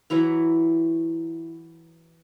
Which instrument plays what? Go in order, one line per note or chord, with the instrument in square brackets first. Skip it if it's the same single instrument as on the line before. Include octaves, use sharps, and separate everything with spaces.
[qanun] E3 F#3 E4 A#5